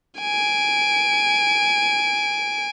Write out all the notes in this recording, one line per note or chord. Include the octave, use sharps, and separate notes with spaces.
G#5 D7